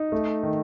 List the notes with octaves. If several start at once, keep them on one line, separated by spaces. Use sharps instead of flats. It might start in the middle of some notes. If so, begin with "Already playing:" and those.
Already playing: D#4
A3
D#3